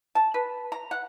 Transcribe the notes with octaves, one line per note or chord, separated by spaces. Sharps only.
A5
B4
A#5
F#5